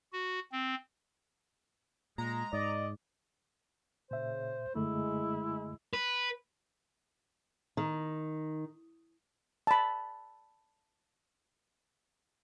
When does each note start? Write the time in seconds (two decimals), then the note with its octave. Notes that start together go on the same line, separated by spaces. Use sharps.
0.12 F#4
0.52 C4
2.18 A#2 G#3 A#5
2.53 G#2 D5 D#5
4.11 A#2 C#3 C5 E5
4.75 F#2 D3 G#3 A3 E4
5.93 B4
7.77 D#3
9.67 A5 B5